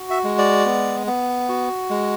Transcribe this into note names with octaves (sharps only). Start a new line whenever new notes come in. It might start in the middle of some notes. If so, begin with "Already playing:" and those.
Already playing: F#4
E5
G#3
D5
B3
B3
F#4
G#3